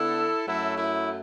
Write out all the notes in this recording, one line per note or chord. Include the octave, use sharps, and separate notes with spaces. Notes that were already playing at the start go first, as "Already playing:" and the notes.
Already playing: D3 B3 E4 A4
F#2 F#3 A3 E4 A4
E4